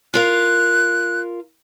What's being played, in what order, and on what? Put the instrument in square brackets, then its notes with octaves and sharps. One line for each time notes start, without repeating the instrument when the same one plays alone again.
[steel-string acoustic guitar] F4 A#4 F5 [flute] F#6